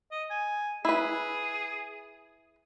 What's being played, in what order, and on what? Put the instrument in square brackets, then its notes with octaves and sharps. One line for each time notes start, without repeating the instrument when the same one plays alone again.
[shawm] D#5
G#5
[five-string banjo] E4 B4 [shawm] G#4